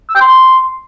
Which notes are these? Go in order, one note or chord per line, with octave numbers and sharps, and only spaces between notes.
E6
G5
C6